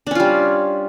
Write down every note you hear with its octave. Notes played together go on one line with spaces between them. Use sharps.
G3 C#4 D4 F4